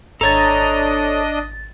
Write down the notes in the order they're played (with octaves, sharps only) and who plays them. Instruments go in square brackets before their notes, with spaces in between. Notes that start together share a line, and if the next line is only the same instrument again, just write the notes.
[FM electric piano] G#1 A6 [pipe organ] D4 D#5 [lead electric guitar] A4 C#5 [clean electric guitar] A#5